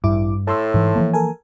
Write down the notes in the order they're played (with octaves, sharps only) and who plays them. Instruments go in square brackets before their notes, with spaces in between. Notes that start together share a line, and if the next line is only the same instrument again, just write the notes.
[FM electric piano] A1 E4 D6 [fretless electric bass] G2
[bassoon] A2 [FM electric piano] A5 C6 E6
[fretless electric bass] G#2 E3
E3 F3 A#3
[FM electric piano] A4 A#4 G#5